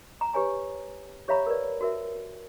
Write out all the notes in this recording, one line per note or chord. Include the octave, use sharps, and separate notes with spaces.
A#5
G4 B4 C#5 G#5 A#5
G4 C#5 E5 F5 A#5 B5
A#4 B4 D5
F#4 A#4 E5